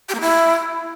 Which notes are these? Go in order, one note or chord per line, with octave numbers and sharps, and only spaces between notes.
G4
A#3
E4